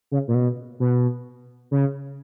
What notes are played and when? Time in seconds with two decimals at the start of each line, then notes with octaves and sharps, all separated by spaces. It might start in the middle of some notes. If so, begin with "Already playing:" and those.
0.11 C#3
0.28 A#2
0.34 B2
0.80 B2
1.71 C#3